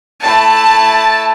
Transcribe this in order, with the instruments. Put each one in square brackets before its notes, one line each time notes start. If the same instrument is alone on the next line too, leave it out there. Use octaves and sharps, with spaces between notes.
[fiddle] A3 E4 [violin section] A5